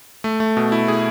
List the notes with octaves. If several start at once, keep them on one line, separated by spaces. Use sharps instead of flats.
A3
A3
B2
E4
G#4